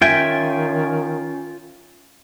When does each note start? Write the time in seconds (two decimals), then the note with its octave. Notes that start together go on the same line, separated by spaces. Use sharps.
0.02 D#3 C#4 F4 E5 G5 G#5